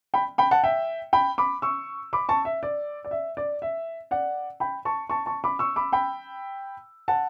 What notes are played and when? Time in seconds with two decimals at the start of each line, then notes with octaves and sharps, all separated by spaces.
0.14 G5 B5
0.38 G5 B5
0.51 F#5 A5
0.63 E5 G5
1.13 G5 B5
1.38 B5 D6
1.62 C#6 E6
2.13 B5 D6
2.29 A5 C#6
2.45 E5
2.63 D5
3.05 D5
3.11 E5
3.37 D5
3.62 E5
4.11 D5 F#5
4.60 G5 B5
4.85 A5 C#6
5.10 A5 C#6
5.26 A5 C#6
5.44 B5 D6
5.59 C#6 E6
5.76 B5 D6
5.93 G5 B5
7.08 F#5 A5